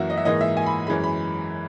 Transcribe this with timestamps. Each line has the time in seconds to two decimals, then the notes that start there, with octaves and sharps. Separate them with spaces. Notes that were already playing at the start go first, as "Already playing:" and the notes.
Already playing: F#2 E3 A#3 F#4 E5
0.10 D#5
0.17 E5
0.25 G#2 E3 A#3 D#5
0.41 E5
0.57 G#5
0.66 B5
0.87 F#2 E3 G#3 B5
1.04 B5